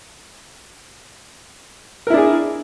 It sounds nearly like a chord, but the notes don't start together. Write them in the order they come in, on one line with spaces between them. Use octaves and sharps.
A#4 E4 D4 G#4